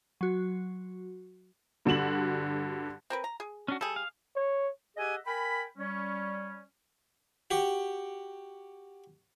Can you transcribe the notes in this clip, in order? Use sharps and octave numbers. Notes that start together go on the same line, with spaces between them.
F#3 F#4
G2 D3 F#4 E7 F#7
C4 A#4 B4
A#5
G#4
C#4 D4 F#4
G3 G#4 A4
F5
C#5
G4 G#4 D#5 E5 F#5 G#5
A#4 G5 G#5 B5
G3 C#4
F#4 G4